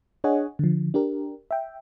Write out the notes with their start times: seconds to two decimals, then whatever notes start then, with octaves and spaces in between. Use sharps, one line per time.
0.24 D4 G#4 C#5 D#5 F#5 G#5
0.59 D3 F3
0.94 D4 G4 A#4
1.51 E5 G5